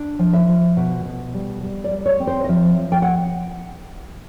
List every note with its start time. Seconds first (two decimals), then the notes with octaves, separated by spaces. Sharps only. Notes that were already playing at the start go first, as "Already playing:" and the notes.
Already playing: D4
0.19 F3
0.33 E5
0.48 F3
0.77 B2
1.05 B2
1.34 G3
1.63 G3
1.84 D5
1.91 G3
2.06 C#5
2.20 C4
2.27 C5
2.44 D#5
2.49 F3 E5
2.77 F3
2.92 G5
3.02 F#5